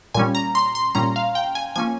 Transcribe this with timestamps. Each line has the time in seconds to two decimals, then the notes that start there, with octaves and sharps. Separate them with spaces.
0.14 A#2 G3 C#4 G#5
0.35 A#5
0.55 C6
0.75 C6
0.95 A#2 G3 C#4 A#5
1.16 F5
1.35 G5
1.55 G#5
1.76 F3 A#3 C#4 G#5